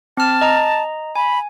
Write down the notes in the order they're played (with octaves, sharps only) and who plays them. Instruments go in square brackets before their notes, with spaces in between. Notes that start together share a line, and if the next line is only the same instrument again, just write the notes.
[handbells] C4 F6 [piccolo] A5
[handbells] D#5 A#5
[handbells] G#5 [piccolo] B5